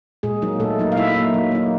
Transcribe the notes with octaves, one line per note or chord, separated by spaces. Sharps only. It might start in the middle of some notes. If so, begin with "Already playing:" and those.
A#2 G#3 G#4
F#3 A#3 D#4
A#2 A3 A4
F#3 A#3 D#4
F5
F#3 E4 E5
A#3 D#4
F#3
A#3 D#4